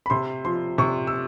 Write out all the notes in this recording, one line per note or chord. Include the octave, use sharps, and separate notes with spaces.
B5
C3 C6
F3 C6
C3 C#6
E6